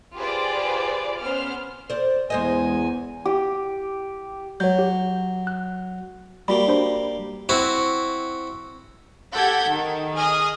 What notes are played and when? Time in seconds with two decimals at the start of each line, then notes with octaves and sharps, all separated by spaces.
0.15 F4 G4 G#4 B4 C5 D5
1.20 B3 C#4 C5 F6
1.90 C5 D5
2.30 E2 G#3 C5 D#5 G#5
3.25 G4
4.60 F#3 C#5 G6
4.79 G4
5.47 F#6
6.48 G3 A#3 F#4 G4 B5
6.68 D4 C5 B5
7.49 C4 E4 F#4
9.34 G4 A4 F#5 G6 G#6 B6
9.67 D#3
10.16 G#4 D#5 G#5 D#6 F6